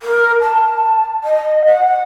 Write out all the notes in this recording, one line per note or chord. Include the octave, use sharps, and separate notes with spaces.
A#4
A5
D#5
F#5